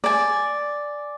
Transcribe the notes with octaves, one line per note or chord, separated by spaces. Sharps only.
D5 G#5